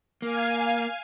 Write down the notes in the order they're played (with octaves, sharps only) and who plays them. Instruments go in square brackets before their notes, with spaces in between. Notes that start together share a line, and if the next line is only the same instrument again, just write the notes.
[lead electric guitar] A#3 [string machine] F5 G#5